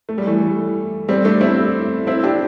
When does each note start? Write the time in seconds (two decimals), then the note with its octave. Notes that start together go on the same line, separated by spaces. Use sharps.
0.09 A3
0.18 G3
0.27 E3 A3
1.09 G3 C4
1.25 A3 D4
1.41 C4 E4
2.07 C4 E4
2.23 D4 G4